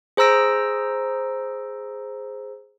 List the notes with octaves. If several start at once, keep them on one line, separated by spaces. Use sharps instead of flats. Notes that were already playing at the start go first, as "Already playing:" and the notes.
G#4 C5 A#5 E6 A#6 D7